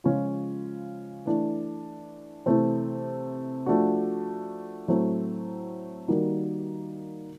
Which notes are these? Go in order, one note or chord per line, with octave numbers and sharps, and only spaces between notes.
C#3 F3 G#3 C#4 F4
E3 A3 D4
C3 E3 A3 C4
F3 A3 D4 F#4
A2 F#3 A3 C4
D#3 G3 A#3 D#4 F#4